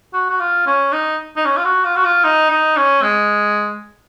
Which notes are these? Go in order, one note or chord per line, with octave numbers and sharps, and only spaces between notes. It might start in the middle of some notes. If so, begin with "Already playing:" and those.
F#4
F#4
F4
C#4
D#4
D#4
C#4
F4
F#4
F4
F#4
F4
D#4
D#4
C#4
G#3